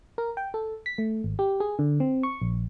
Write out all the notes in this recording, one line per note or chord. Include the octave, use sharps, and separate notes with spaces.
A#4
G5
A4
B6
A3
G#1
G4
G#4
D3
C4
C#6
A#1